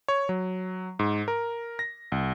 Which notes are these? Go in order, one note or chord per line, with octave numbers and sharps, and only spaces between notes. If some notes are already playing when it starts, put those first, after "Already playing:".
C#5
F#3
G#2
A#4
A#6
C2